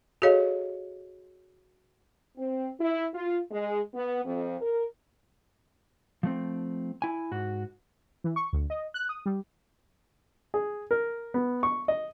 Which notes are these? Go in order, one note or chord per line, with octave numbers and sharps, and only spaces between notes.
F#4 G#4 A4 C#5 D#5 F5
C4
E4
F4
G#3
B3
F2
A#4
F3 A3 C4
E4 G#5
G#2 F#4
E3
C#6
D2
D#5
F#6
D#6
G3
G#4
A#4
B3
C#6
D#5